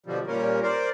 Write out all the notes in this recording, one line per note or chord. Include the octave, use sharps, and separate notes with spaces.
B2 D3 F3 G3
A#2 G3 A#3 C#4 A#4
A#4 C5 D5